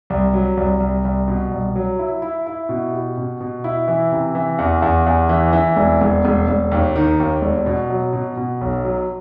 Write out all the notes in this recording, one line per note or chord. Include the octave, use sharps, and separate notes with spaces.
C2
F#3
C2
C2
C2
B2
C2
F#3
E4
E4
E4
B2
G4
B2
B2
E4
E3
C3
E3
E2
E2
E2
E3
E3
E1
E1
E1
E1
D#2
D#3
D#2
E1
B2
F#3
B2
B2
B1
F#3